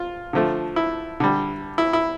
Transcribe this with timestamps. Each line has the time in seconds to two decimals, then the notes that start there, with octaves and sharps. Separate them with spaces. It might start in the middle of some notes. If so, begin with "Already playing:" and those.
Already playing: F4
0.33 D3 F3 A3
0.76 E4
1.20 D3 G3
1.78 E4
1.93 E4